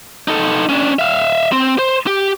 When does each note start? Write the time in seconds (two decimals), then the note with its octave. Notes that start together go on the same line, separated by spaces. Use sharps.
0.28 D#4 A4
0.69 C#4 D4
0.99 E5 F5
1.52 C4
1.79 C5
2.07 G4